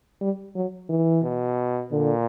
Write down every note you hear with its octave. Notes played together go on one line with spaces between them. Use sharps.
G3
F#3
E3
B2
A#2 D3